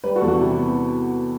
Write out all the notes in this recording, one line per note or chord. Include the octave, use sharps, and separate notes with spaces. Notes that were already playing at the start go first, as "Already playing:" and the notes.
G3 G4 B4
F#4 A4
E2
F#4
C3 E4 G4
B3